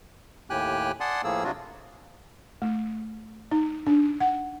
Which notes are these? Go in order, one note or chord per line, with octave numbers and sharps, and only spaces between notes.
D#2 A2 G4 G5 G#5 F#6
D5 F#5 G#5 A5 C6 D#6
A2 F3 A#3 G#4 E6
C3 F#3 D4 F4 F#4
A3
D#4
D4
F#5